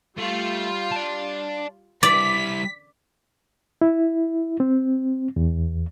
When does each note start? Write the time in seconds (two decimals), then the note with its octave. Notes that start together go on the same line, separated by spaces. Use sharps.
0.17 G3 A3 F4
0.92 D5 A5
2.03 G3 E4 D5 B6
3.81 E4
4.60 C4
5.36 E2